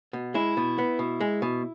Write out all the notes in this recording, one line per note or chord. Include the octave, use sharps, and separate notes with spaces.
B2
G#3 E4
B2
B3
B2
G#3
B2